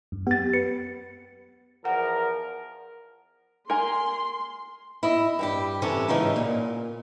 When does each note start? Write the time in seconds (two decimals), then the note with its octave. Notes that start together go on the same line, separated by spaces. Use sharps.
0.12 F#2
0.27 B3 G4 A6
0.54 B4 C#7
1.85 E2 F3 A#4 F#5
3.70 A#4 G#5 C6
5.03 E4 D#5
5.39 G2 G3 G4
5.82 C3 E3 C#4 D4 A4
6.08 G#2 C#3 E3 D#4 F4
6.36 A#2